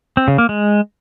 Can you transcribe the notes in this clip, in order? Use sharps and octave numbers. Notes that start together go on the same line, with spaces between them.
C4
C#3
A#3
G#3